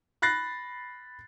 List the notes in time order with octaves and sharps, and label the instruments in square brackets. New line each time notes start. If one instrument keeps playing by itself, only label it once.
[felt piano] B5 F#6 A6 A#6 C7